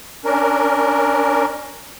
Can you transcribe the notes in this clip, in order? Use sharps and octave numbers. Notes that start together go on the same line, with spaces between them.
C#4 D4 A#4